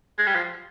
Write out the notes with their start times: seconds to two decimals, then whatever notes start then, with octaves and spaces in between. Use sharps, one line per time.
0.19 G#3
0.27 G3
0.35 F3